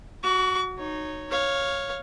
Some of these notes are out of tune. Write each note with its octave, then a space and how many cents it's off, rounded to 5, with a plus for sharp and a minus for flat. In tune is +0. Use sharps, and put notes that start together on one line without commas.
F#4 +0 C#6 +40
D#4 -15 C#5 +0
C#5 -5 F5 +5